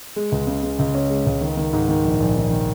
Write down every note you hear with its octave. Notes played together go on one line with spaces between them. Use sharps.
G#3
C#2
C#3
C#3
C#2
C#4
G#3
C#2
D#3
D#3
G#2
D#3
A#1
A#1
D#3
D#3